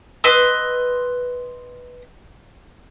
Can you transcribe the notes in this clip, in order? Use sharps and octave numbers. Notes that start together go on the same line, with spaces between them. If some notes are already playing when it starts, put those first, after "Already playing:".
B4 D#5 C6 E6